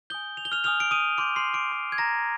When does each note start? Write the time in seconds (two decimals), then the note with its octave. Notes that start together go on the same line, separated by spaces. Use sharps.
0.10 G#5 D#6 G6 G7
0.37 F7
0.45 G7
0.52 F6 F7
0.64 G#5 D#6 F6 G6 F7
0.80 D7
0.91 D#6 D#7
1.18 C6 D6 D#6 G6 D7
1.36 C6 C7
1.54 D6 D7
1.72 C6 D#6 G6
1.92 G#6
1.98 A#5 A#6